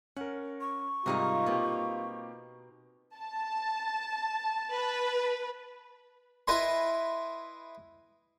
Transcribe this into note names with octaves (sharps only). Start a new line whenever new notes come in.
C#4 A#4 F#5
C#6
G#2 C3 G3 A#3 D#4 F4 A#4
B2 A#3 C4 G4
A5
B4
E4 B4 D#5 G#5 C6